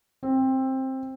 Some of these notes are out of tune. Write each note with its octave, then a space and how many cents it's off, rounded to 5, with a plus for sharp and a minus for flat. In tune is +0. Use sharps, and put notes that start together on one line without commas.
C4 +15